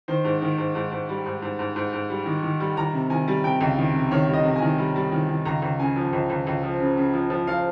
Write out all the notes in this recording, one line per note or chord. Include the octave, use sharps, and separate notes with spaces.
D#3 C5
G#2
D#3
G#2
G#2
G#2
G3
G#2
G#2
G#2
G#2
G#2
G3
D#3
D#3
G3
D#3 A#5
C3
D#3 G#5
G3
C3 G5
C#2
D#3
C3
D#3 C#5
G3 D#5
C3
G#5
D#3
G3
G3
D#3
D#3
C#2 A#5
C#2
C#3 G#5
F3
C#2
C#2
C#2
F3
C#3
C#3
F3
F3
F3 F5